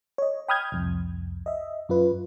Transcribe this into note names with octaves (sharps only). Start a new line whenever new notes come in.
C#5 D#5
G5 B5 D#6 F6 G6 G#6
C2 F2
D#5 E5
F#2 F4 B4